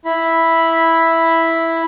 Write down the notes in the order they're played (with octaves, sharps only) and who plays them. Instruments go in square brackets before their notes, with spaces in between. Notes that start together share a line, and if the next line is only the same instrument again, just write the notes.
[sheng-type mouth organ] E4 B5